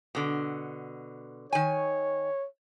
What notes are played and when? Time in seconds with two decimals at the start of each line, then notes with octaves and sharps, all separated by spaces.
0.15 B2 D3
1.52 D#3 C#5 G#5